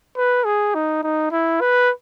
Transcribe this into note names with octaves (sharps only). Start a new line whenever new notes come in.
B4
G#4
D#4
D#4
E4
B4